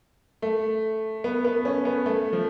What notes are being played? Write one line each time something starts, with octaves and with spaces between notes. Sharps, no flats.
A3
B3
B3
C#4
B3
A3
F3